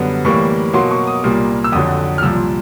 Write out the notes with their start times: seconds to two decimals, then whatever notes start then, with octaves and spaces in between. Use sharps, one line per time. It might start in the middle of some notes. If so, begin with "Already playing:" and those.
Already playing: F#2 D3 G3 B3
0.25 A2 E3 G3 A#3 C#6
0.73 B2 F#3 A#3 C6
0.91 C#6
1.07 D#6
1.24 C2 A#2 G3 A#3
1.64 E6
1.72 F2 D3 F#3 D#6
2.18 F6
2.22 C2 A#2 F3 E6